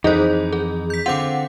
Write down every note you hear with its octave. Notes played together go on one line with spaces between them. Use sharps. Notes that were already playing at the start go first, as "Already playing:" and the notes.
F2 E3 D#4 G#4 C5
G#4
G6 B6
D3 C4 F4 F#5 D6